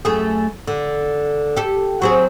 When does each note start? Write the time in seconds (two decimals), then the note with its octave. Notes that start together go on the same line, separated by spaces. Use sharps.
0.05 F#2 A3 G#4
0.67 D3
1.56 G4 A4
2.02 F#3 C4 G#4